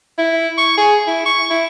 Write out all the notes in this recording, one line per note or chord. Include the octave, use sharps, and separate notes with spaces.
E4
C#6
G#4
E4
C#6
E4